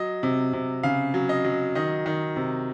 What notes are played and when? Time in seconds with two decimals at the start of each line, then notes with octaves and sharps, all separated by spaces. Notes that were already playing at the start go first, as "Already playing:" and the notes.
Already playing: F#3 D#5
0.23 C3
0.53 C3
0.83 C#3 F5
1.14 F#3
1.29 D#5
1.44 F#3
1.75 D#3 D#5
2.06 D#3
2.36 C3